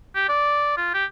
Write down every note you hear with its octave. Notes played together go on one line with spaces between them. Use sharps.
G4
D5
F4
G4